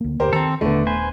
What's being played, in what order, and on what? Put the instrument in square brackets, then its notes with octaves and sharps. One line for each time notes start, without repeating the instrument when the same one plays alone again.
[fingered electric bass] D2 A#3
[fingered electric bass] D2 [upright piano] G4 A#4 C5
[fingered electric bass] D#3 [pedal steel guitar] C4 A4 [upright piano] A#5
[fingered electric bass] D#1 [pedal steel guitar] D3 [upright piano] A3 B3
[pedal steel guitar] B4 C5 G#5